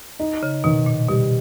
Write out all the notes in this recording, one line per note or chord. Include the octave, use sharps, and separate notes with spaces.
D#4
C#3
B2 D#3
A#2
B2 G3